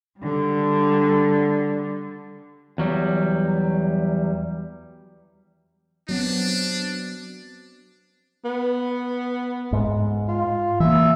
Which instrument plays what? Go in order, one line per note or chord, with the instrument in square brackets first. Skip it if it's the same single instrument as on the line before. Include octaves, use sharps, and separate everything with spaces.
[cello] D3 G3
[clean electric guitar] E2 F#3 G3
[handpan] F#3 B3 C4 [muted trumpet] D4
[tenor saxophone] B3
[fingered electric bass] G#2
[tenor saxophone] F4
[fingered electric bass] E3 A#3 [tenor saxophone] E5